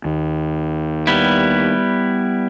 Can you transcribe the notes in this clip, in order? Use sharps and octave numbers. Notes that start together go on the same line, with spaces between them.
D#2
G3 B3 E4